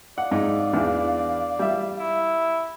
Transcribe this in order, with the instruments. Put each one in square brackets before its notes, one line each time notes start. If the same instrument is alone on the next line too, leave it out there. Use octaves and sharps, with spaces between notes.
[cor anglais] D5 [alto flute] F5 [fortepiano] F#5
[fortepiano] G#2
E2 E3 D4
G3 E5
[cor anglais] E4